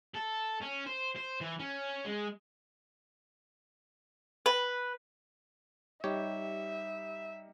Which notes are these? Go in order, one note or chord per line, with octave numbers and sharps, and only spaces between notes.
A4
C#4
C5
C5
E3
C#4
G#3
B4
G3 D#4 G4 C#5 D#5 E5